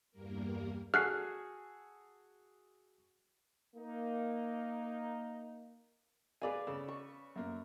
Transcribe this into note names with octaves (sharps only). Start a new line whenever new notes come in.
E2 G2 G3 A#3 A#4
F#4 G#4 A4 F6 F#6 C7
A#3 D#4
G#4 B4 D5 F5 G#5
C#3 E6
C#6
F#2 A#3